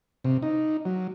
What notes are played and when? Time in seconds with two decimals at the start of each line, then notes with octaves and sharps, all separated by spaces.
0.24 C3
0.42 D#4
0.85 F#3